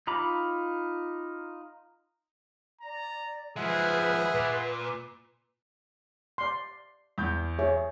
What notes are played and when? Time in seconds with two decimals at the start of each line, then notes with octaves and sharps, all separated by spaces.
0.07 D#4 F4 A#5 B5 D6
2.81 D5 A#5
3.57 F3 G#3 G#4 B4 E5 F#5 C6
4.35 A#2
6.38 D5 C6
7.18 E2 G6
7.59 G#4 C#5 E5